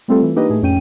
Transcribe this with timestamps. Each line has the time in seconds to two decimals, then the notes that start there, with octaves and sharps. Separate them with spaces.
0.08 G3 A3 C4 F4 A4
0.23 E3
0.36 A#3 D4 D#4 G4 B4 D#5
0.50 A2 A3 G#4
0.62 F2 C#4 G5 D#7